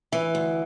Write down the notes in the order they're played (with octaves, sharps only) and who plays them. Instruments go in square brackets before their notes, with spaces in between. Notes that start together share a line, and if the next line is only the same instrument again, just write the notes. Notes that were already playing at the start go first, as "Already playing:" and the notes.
[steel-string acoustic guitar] E3 [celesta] E5
[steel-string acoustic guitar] D2